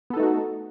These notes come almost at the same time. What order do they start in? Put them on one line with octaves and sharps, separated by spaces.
B3 A4 D#4 A3 F#4